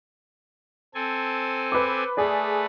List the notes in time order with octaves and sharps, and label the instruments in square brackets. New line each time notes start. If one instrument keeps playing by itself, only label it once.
[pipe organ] C4 A4 G#5
[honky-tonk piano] B4 D6
[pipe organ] A3 B4 [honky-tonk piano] G#4 D5